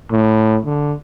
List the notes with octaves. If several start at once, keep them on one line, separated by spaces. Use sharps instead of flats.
A2
D3